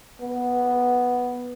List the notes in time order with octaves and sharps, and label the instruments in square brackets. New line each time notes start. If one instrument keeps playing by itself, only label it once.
[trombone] B3